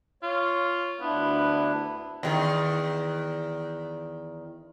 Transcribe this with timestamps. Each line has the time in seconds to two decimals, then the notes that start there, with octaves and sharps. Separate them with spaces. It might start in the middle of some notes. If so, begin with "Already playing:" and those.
0.23 F4 C#5
1.01 D2 B3 D4 E4
2.23 E2 B2 D#3